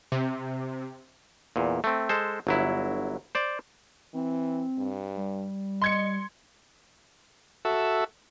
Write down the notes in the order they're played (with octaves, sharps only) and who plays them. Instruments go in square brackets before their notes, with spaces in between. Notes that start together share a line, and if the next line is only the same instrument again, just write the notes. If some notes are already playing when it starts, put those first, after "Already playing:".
[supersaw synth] C3
[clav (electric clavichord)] E2 A#2
A3 C4
G#3 A4 C5
G1 F#3 E4
C5 D5
[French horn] E3 [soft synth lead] C4
[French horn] G2
[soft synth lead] G3
[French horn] D#5 [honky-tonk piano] C6 G#6 C#7
[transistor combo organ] F#4 A4 E5